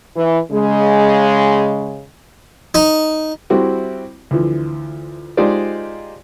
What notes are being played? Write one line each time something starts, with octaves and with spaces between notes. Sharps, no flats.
E3
C#3 G#3
D#4
G3 C4 E4 F#4 G4
D2 E3 F3
G#3 D#4 F4 G4 C5 D5